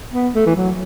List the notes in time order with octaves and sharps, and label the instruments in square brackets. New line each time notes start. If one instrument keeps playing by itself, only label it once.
[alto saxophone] B3
A3
E3
F#3